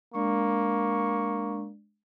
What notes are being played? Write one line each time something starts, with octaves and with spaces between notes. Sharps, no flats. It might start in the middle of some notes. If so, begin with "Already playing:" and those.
G#3 A#3 D4 D5 C#6